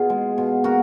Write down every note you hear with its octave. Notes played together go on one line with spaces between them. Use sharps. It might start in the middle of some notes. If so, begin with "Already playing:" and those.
Already playing: B2 F4 G#4
G#3
B2
A#3 F#4 A#4